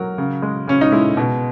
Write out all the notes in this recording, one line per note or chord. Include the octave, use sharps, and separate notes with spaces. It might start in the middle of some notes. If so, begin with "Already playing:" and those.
Already playing: F#3 A#4
C#3
G#3
C#3 C#4
D#4
G#3 E4
B2